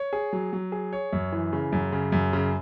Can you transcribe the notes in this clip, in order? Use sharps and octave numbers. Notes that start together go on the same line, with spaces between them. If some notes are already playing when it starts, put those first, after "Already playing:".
Already playing: C#5
G#4
F#3
F#3
G#4
C#5
F#2
E3
C#3
F#2
C#3
F#2
C#3